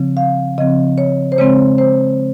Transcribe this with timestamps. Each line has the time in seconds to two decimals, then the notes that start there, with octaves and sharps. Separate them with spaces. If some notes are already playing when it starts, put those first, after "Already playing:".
Already playing: C#3 F3 C4
0.17 F5
0.58 C#3 F3 C4 D#5
0.98 C#5
1.32 C5
1.38 C#3 G#3 C4 C#5
1.78 C5